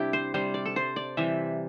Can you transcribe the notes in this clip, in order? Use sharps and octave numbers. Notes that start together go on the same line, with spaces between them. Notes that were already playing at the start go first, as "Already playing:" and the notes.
Already playing: C3 G3 D4 E4 G4
C5
C3 G3 C5
D5
A4
C5
D5
C3 E3 G3 E5